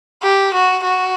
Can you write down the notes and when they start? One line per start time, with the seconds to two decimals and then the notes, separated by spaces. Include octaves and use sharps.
0.23 G4
0.54 F#4
0.85 F#4